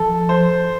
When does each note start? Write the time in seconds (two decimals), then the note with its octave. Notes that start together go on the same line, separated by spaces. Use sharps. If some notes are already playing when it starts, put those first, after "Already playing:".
Already playing: F3 A4
0.29 C5